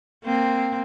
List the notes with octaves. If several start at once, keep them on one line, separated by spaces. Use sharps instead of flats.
A#3 C4